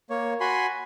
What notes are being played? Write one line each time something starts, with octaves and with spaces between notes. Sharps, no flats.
A#3 C#5
F#4 G#5 B5 C6